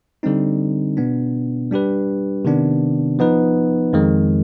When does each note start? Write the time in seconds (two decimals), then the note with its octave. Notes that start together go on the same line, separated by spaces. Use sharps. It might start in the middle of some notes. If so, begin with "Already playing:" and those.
0.23 D3 G3 C4 D#4
0.97 B2 B3 D4
1.71 G3 D4 G4 B4
2.45 C3 D#3 B3 D4
3.19 F3 B3 D#4 B4
3.93 F2 D#3 G#3